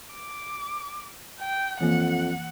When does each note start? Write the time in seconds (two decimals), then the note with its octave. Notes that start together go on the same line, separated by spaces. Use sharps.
0.13 D6
1.40 G5
1.81 F2 E3 A#3 F#5